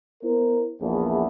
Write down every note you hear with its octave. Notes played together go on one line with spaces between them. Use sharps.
B3 E4 A#4 C5
A#1 E2